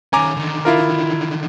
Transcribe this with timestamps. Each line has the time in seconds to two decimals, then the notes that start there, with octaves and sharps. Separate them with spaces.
0.13 D#3 C#4 G#5 A#5 D6
0.37 D3 D#3
0.65 E4 F4 A#4